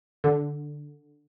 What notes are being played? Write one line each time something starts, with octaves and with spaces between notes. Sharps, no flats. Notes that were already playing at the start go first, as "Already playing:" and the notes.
D3